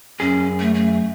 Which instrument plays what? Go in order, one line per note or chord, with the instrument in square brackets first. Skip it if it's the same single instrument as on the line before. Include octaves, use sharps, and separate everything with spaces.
[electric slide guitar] F#2 G#4 [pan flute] C#4
[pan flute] A3
A3